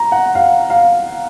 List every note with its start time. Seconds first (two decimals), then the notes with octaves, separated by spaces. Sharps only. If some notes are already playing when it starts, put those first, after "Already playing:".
Already playing: A#5
0.12 F#5
0.35 F5
0.70 F5